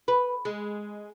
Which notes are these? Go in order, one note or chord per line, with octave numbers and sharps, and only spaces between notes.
B4
G#3